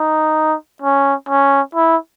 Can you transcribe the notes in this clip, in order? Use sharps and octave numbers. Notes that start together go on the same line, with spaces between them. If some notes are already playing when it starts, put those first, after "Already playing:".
Already playing: D#4
C#4
C#4
E4